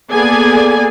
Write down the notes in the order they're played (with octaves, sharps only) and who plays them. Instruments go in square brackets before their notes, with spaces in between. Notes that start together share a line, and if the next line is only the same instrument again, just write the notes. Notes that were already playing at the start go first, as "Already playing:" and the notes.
[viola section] A#3 B3 G#4 A4 D5 G#5